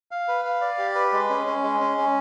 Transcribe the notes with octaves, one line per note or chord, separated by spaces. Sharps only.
F5
B4
F5
D5
G4
B4
G#3
C#4
C#4
G#3
C#4
C#4